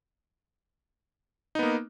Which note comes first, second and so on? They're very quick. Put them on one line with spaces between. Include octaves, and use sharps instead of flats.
D#4 B3 A#3